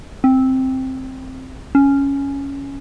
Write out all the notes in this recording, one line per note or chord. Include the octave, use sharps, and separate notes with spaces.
C4
C#4